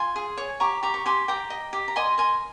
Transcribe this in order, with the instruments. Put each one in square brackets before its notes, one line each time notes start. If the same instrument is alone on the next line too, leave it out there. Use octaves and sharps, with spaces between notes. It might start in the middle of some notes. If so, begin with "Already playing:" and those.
Already playing: [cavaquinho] F4 G#5 C6
G#4
C#5
G4 A#5 C#6
G4 A#5 C#6
C#6
G4 G#5 C6
G4 G5 A#5
D#5
G4
A#5
D#5 G#5 C6
A#4 G#5 C6